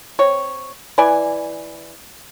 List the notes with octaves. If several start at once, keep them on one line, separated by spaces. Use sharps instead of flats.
C4 C#5
E3 B4 D5 G#5